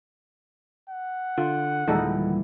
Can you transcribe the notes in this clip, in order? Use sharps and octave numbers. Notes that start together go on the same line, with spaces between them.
F#5
D3 F4
D#2 A#2 D3 E3 G3 G#3 D#4 A4